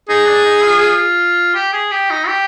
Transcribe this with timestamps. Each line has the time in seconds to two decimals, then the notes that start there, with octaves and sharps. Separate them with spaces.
0.09 D#4 G#4
0.27 D4
0.45 D#4
0.64 F4
1.55 G4
1.73 G#4
1.92 G4
2.10 D#4
2.28 G4